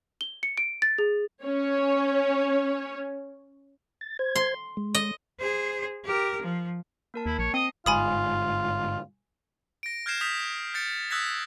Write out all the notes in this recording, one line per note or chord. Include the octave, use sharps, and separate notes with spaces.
G7
C#7
D7
A6
G#4
C#4 C#5
A6
C5 G#6
C6
G#3
D#5
G#4 C5
G4 A#4
F3
A#3 A#4 A5
D#2 E4
A#1 C#5 A5
C4 D#5 D#6 C7
G1 G#2 F4 G#5 B5 D#6
A#6 D7
F6 G6 G#6 A#6 C7 E7
D#6 G6 A#6 B6 F7
G6 A6 C#7
D#6 E6 F#6 G#6 A#6 B6